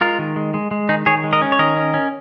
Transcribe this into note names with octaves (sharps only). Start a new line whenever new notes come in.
G#3 F4 A#4
D#3
G#3
G#3
G#3
D#3 D#4 G#4
D#3 G#4 C#5
G#3
A#4 D#5
C#4
C#5
D#3 A#4 D#5
C#4
C#4